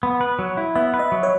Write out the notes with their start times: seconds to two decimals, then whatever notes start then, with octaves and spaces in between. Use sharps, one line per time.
0.03 B3
0.21 B4
0.39 F#3
0.57 E4
0.76 B3 E5
0.94 B4
0.99 D#5
1.12 F#3
1.23 C#5